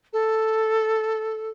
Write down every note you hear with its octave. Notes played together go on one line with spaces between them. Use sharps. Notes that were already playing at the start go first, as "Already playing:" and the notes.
A4